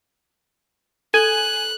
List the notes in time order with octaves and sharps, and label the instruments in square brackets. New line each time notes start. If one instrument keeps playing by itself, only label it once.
[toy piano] A4 [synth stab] G#5 [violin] F#6